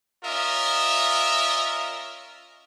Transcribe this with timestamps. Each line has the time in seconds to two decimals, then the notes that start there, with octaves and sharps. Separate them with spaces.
0.24 C#4 F4 A#4 D#5 E5